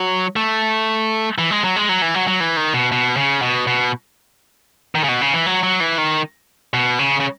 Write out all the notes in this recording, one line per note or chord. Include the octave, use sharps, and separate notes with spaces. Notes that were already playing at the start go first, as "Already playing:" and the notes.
Already playing: F#3
A3
E3
G#3
F#3
G#3
F#3
E3
F#3
F#3
E3
D#3
B2
B2
C#3
B2
B2
D#3
C#3
B2
C#3
E3
F#3
F#3
E3
D#3
B2
C#3
C#3